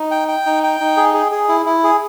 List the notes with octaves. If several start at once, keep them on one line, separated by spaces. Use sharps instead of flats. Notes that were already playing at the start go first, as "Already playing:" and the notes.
Already playing: D#4
G5
G5
D#4
G5
D#4
G#4
G#4
G#4
E4
E4
G#4